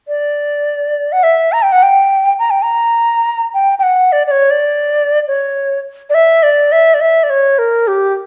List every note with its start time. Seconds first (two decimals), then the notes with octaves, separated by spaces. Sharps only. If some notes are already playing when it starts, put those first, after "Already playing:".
0.08 D5
1.12 F#5
1.23 E5
1.52 A#5
1.62 G5
1.72 F#5
1.83 G5
2.39 A#5
2.51 G5
2.62 A#5
3.54 G5
3.79 G5
3.83 F#5
4.12 D5
4.27 D5
4.31 C#5
4.51 D5
5.28 C#5
6.10 D5
6.14 E5
6.43 D5
6.72 E5
6.94 D5
7.01 E5
7.23 D5
7.30 C#5
7.58 A#4
7.88 G4